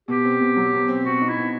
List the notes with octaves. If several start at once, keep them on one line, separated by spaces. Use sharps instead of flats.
B2 G4
C4
B2
F#3
B2
C4
B2 F#4
D#4
E4
B2